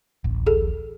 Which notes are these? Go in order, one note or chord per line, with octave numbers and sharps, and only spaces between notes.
D1 A1
G#4 A4